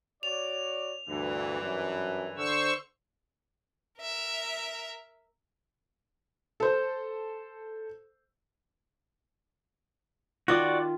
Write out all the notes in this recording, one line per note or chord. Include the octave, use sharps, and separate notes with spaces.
F#4 C#5 D5 F7
D2 G2 E3
F#2
D3 C5 C#6 E6
A#4 E5
A4 C5
D#3 F4 F#4 D5 D6